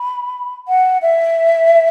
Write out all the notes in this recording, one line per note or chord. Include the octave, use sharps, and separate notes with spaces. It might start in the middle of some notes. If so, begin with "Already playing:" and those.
Already playing: B5
F#5
E5